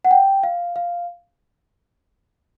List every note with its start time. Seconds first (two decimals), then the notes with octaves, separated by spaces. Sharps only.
0.05 F#5
0.11 G5
0.43 F5
0.76 F5